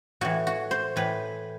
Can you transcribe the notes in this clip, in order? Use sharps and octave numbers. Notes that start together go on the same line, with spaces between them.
A2 E3 F#4
F#4
C5
A2 E3 B4